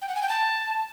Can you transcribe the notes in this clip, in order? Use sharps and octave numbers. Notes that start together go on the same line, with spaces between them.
G5
F#5
G#5
G5
A5